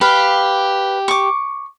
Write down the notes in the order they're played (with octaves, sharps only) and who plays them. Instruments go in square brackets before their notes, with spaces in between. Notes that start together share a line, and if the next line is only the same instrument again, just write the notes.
[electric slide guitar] G4 [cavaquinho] B4 F5
[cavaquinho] C#6 D6